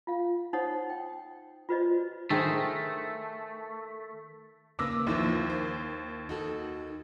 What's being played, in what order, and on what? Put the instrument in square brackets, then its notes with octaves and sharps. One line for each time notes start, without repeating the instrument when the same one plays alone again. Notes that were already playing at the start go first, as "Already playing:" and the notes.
[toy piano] F4 F5
D#4 C5 C#5 F#5 D#6
G5
F4 F#4 B4 C5 D5 D#5
[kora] D#3 G#4 C5 [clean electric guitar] A3
[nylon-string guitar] C#3 A#3 B4 [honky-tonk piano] D6 E6 A#6
[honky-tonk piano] D#2 [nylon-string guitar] F3 A#3 E4
[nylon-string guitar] C5
D#4 F#4 A4